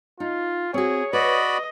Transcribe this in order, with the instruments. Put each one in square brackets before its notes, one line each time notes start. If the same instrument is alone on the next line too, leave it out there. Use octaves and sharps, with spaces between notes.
[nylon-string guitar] D#4 [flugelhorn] F4
[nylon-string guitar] C4 F#4 [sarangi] G#4 [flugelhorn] C#5
[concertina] F#4 D5 B5 [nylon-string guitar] B4 [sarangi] D#5